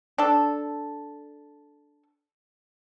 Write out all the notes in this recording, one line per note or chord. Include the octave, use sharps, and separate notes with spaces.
D4 A4